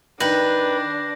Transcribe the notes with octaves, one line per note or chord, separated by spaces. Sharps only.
D#3 D4 B4 G5 G6 A#6